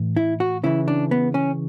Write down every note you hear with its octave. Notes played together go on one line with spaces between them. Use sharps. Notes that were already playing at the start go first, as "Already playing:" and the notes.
Already playing: A2 E3
E4
F#4
C#3 E3 E4
D4
B3
C#4